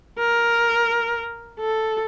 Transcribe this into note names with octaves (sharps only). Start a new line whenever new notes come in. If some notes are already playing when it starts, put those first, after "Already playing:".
A#4
A4